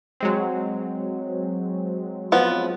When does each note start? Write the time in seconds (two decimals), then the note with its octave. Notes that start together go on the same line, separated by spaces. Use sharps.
0.20 F#3 G#3 C4
2.32 F3 B3